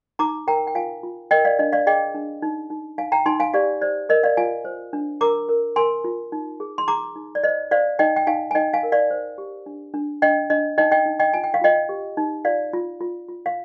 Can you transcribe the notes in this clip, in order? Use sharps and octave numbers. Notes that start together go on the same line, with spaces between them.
D#4 A#5 D6
A#4 G5 A#5
G5
F4 F5 G#5
F4
A#4 D#5 G5
D5 F5
D4 D#5
D5 F5
G#4 D#5 G5
D4
D#4
D#4
D#4 F5 G#5
G5 A#5
D#4 G#5 C6
F5 G#5
G4 D5 F5
C5 D5
A#4 D#5
D5 F5
F4 F5 G#5
C5
D4
A#4 A#5 D6
A#4
A#4 G#5 C6
F4
D#4
G#4
C6
G#4 A#5 D6
D#4
D5
C5 D#5
C5 D5 F5
D#4 D#5 G5
G5
D#4 F5 G#5
G#5
D#4 D#5 G5
F5 G#5
A#4
D5 F5
C5
G4
D4
D4
D4 D#5 G5
D4 D#5
D#4 D#5 G5
D#5 G5
D#4
D#5 G5
F4 G#5
G5
F5
F4 D#5 G5
G4
D#4
F4 D5 F5
F4
F4
F4
F5